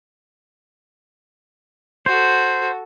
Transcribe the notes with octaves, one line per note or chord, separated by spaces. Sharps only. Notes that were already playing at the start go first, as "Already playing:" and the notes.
F#4 A4 C5